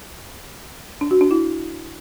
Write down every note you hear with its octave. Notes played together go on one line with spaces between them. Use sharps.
D4
F#4
D4
E4